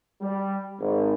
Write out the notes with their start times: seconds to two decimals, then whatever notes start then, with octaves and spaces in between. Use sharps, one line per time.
0.21 G3
0.79 G#1